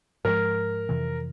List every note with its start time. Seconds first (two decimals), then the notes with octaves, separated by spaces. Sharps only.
0.25 G#2 F3 G#3 A#4
0.89 F2 C3 E3